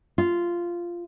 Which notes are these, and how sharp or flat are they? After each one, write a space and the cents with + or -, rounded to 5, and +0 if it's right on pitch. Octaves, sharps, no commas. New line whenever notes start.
F4 -10